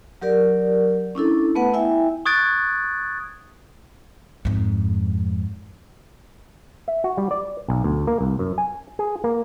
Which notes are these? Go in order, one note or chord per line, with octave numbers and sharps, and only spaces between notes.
F#3 G4 A#4 D5
C#4 D4 E4 A4
A3 B3 B4 F#5
E4 E5 G5 G#5
C#6 D#6 F#6 G#6 A6 D7
F2 G#2
E5
F#4
G3
D5
B1
D2
A#3
C2
F#2
G#5
G#4
A#3